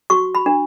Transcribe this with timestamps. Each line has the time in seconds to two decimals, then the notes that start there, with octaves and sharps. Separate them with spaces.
0.10 F#4 C#6
0.35 B5
0.46 D4